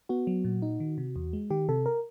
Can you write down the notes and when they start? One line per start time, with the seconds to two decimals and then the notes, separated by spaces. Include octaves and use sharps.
0.09 B3 F#4
0.27 F#3
0.45 A#2
0.62 D#4
0.80 D#3
0.98 C3
1.16 E2
1.33 G#3
1.51 D#3 G4
1.69 C3 A4
1.86 A#4